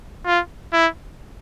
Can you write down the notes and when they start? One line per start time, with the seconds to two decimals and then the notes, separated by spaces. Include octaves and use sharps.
0.26 F4
0.73 E4